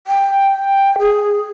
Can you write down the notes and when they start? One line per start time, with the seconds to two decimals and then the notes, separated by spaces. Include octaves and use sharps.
0.07 G5
0.99 G#4